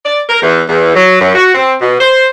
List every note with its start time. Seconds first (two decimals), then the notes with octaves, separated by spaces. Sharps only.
0.06 D5
0.29 A#4
0.42 E2
0.69 E2
0.95 F#3
1.21 F#2
1.35 F#4
1.55 C4
1.81 B2
1.99 C5